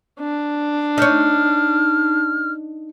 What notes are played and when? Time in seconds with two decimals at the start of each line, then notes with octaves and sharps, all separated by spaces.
0.19 D4
0.98 D#4 C#5 F6